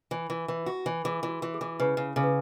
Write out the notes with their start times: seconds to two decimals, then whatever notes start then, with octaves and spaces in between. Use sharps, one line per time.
0.11 E3
0.30 E3
0.48 E3
0.66 F#4
0.86 E3
1.04 E3 G#4
1.23 E3
1.29 F#4
1.42 E3
1.54 G#4
1.61 E3
1.80 C#3 B4
1.97 C#3
2.16 C#3 G#4
2.23 B4